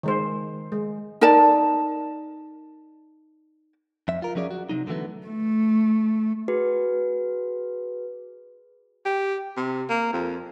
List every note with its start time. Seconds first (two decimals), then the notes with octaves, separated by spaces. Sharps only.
0.03 D#3 G#3 C5
0.72 G#3
1.21 D#4 A#4 D5 A5
4.08 F2 E5
4.22 F4 A#4
4.35 F3 F#3 C#4 G#4 D5
4.51 F#4
4.69 C3 F#3 D#4
4.87 D3 E3 F#3 A3 B3
5.26 A3
6.48 F#4 G#4 B4
9.06 G4
9.57 C3
9.90 A#3
10.13 F2